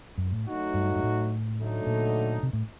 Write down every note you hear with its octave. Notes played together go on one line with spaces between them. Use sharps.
F#2
A2
F#3 A3 D#4 F#4
G2
G2
A2
D3 F#3 A3 D#4 A4
A#2
C3
A2